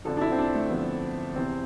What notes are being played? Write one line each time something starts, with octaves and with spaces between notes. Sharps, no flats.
G1 F2 D3 F3 A4
D4
E4
C4
D4
A3
G1 F2 D3 F3 B3
E2 C3 E3 C4